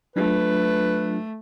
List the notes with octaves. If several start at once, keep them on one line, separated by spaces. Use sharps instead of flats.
F#3 A3 D4 F4 B4